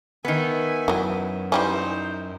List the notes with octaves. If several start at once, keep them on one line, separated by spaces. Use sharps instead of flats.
D#3 B3 E5 G#5
F#2 E3 F#3
E3 G3 C#4 D#4 C5